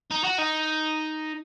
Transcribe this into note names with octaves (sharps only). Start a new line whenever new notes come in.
D#4
F#4
D#4